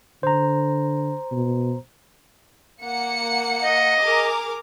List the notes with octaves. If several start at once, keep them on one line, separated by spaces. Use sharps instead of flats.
D3 C5 A#5
B2
A#3 F#5 C#7
D#5
G#4 A#4 D6